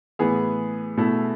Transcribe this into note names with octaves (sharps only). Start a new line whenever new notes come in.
A2 E3 B3 G#4
B2 A3 E4